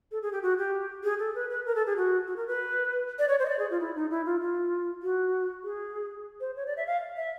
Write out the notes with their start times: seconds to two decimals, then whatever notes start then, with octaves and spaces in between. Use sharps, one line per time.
0.12 A4
0.22 G#4
0.32 G4
0.43 F#4
0.58 G4
1.04 G#4
1.19 A4
1.35 B4
1.50 B4
1.66 A#4
1.75 A4
1.86 G#4
1.97 F#4
2.27 F#4
2.36 A#4
2.47 B4
3.19 D5
3.28 C#5
3.39 C5
3.46 D#5
3.49 D5
3.59 G#4
3.70 F4
3.80 E4
3.96 D#4
4.11 E4
4.26 F4
4.41 F4
5.03 F#4
5.64 G#4
6.40 C5
6.56 C#5
6.66 D5
6.77 E5
6.87 F5
7.17 E5